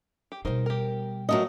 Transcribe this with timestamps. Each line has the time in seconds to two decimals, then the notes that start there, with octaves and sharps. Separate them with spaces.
0.32 G4
0.45 B2 G3 D#4 A#4 C5
0.66 G4 A#4
1.29 F#3 A3 C#4 A#4 D#5